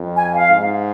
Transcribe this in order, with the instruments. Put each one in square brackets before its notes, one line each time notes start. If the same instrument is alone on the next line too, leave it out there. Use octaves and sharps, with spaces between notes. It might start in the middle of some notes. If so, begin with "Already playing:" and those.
Already playing: [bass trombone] F2
[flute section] G#5
F5
[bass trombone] G#2